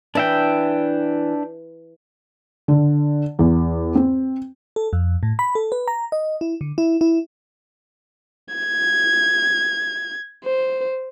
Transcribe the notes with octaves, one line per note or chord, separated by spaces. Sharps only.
E3 D4 E5 G5
D3
E2
C4
A4
F2
A2
B5
A4
B4
A#5
D#5
E4
D3
E4
E4
G#6
C5